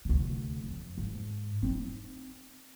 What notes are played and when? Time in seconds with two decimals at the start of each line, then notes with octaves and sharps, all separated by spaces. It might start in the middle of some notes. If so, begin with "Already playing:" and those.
0.05 D2 C3
0.64 F2
0.98 G#2
1.62 C4 D#4